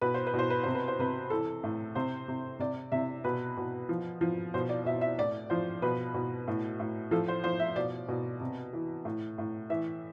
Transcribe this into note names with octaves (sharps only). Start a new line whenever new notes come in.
B2 B4
C5
B4
B2 C5
B4
C3 C5
B4
C5
C3 B4
E3 A4
A2
C3 C5
C3
C3 D5
C3 E5
B2 B4
B2
F3
F3
B2 C5
D5
B2 E5
E5
A2 D5
F3 C5
B2 B4
B2
A2
A2
F3 A4
C5
F3 C5
E5
B2 D5
B2
C3
E3
A2
A2
E3 E5